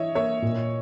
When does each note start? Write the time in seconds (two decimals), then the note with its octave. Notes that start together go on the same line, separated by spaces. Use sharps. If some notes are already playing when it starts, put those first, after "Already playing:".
Already playing: E3 E4 C#5 D#5 E5
0.15 A#3 C#5 E5
0.42 A#2